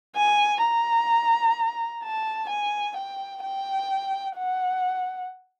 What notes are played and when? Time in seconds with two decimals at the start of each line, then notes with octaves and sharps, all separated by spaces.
0.16 G#5
0.63 A#5
2.03 A5
2.50 G#5
2.97 G5
3.43 G5
4.37 F#5